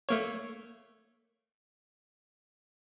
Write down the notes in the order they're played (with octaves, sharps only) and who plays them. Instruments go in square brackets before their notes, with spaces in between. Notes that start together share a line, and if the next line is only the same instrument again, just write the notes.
[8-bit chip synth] A3 A#3 C#5